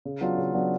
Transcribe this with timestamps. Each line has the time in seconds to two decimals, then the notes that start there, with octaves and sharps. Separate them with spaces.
0.05 C#3
0.21 F#3 B3 D4 F4
0.38 C#3
0.53 F#3 B3 D4 F4